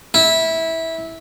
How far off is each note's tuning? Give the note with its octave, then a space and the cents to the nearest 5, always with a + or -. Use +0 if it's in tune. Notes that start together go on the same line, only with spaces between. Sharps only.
E4 -15